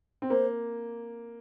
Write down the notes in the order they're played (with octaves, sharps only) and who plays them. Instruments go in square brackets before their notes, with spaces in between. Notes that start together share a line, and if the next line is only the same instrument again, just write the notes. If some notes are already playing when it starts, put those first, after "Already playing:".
[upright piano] C4
[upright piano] A#3 [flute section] C5